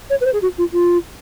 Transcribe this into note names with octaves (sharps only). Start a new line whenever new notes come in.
C#5
B4
C5
G#4
F#4
F4
F4